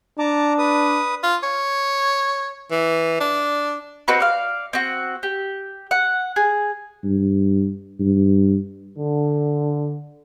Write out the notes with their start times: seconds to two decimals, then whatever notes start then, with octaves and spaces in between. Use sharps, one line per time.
0.19 D4 A5 A#5 D6
0.58 B4 D#6
1.23 F4
1.43 C#5
2.71 E3
3.20 D4
4.08 C4 D#4 F#4 B4
4.20 D5 F5
4.73 C4 F#4
5.23 G4
5.91 F#5
6.36 G#4
7.04 G2
8.00 G2
8.98 D3